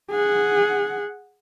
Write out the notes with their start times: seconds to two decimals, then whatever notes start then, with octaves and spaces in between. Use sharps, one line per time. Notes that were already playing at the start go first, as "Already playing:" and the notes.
0.11 G#4 F#5